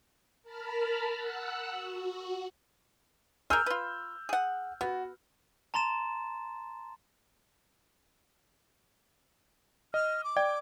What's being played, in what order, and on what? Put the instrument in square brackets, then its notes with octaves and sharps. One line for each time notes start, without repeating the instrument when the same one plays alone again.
[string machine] A#4 A5 B5 F6
F#5 E6 F#6
F#4
[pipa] G#4 A#4 [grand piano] E6 F6 G6
[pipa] F4 B4
G#4 F#5
[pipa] B3 [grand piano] F#4
[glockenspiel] A5 A#5 C6 A6 E7
[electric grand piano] D#5 [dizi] F6
[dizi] D6
[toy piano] D5 [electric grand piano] G5